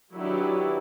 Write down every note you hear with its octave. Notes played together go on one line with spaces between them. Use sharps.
D#3 F#3 D4 E4 G4 B4